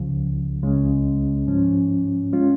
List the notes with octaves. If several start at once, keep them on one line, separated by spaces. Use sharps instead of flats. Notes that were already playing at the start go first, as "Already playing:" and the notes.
Already playing: C#2 C#3 F3
C#2 C#3 G#3 C#4
G#2 F3 C#4
G#3 C#4 F4